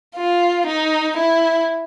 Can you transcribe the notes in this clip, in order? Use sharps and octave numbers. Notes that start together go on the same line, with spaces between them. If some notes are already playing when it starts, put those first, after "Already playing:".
F4
D#4
E4